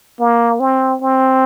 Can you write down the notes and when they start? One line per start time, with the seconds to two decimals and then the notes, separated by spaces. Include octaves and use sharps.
0.20 A#3
0.60 C4
1.02 C4